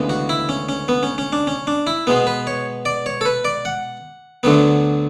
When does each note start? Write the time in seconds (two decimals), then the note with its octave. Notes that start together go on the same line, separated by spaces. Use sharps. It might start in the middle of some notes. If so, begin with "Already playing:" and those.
Already playing: D2 C#3 E3 G#3 B3
0.09 F#4
0.29 E4
0.49 C#4
0.69 C#4
0.88 B3
1.03 C#4
1.18 C#4
1.33 D4
1.47 C#4
1.67 D4
1.87 E4
2.07 B2 G#3 B3
2.27 B4
2.47 C#5
2.85 D5
3.06 C#5
3.21 A4
3.26 B4
3.45 D5
3.65 F#5
4.43 D2 D3 F#3 B3